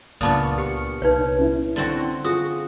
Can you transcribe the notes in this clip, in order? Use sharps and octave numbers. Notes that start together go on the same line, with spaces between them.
C#2 A#2 B3 D4 A5 C#6 D#6
G4 F6 C#7
C2 D#4 B4 C#5
C#4 E4
D3 C4 F#4
F4 F#4 G#4 D#6